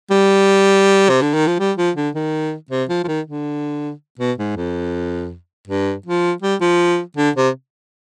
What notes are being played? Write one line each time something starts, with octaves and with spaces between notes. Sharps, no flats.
G3
C3
D3
D#3
F3
G3
F3
D3
D#3
C3
F3
F3
D#3
D3
B2
G#2
F2
G2
F3
G3
F3
D3
C3